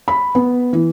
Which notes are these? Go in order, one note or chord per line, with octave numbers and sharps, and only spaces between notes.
B5
B3
E3